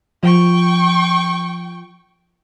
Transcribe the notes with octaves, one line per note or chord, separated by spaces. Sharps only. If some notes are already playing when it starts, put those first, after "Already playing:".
F3 G5 C#6